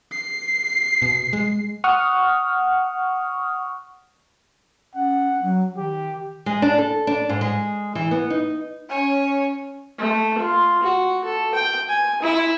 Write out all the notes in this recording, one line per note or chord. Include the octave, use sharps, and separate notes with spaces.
C7
B2
G#3
F#5 C#6 D#6 F6
C#4 F#5
F#3
D#3 G4
G#3
D4
A4
D4
G#2
G#3
E3
B3
D#4
C#4 C#5 G#5
A3
F4
F#4
A4
G5
G#5
E4